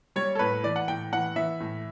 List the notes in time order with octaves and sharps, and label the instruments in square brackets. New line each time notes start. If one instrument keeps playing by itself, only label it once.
[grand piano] G3 C#5
A4
A2 B4
E3 D5
F#5
A2 G5
E3 F#5
E3 E5
A2